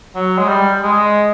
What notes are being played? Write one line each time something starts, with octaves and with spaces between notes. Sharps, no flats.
F#3
G#3
G3
G#3